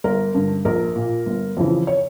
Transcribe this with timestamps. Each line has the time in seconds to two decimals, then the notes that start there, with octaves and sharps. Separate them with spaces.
0.04 G1 A#4
0.35 G2 D3
0.65 A#1 A#4
0.96 A#2
1.26 G1
1.57 F2 C#3 E3
1.87 C#5